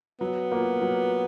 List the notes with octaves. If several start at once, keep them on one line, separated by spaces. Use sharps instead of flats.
F#3 B3
A#3 F4
F#3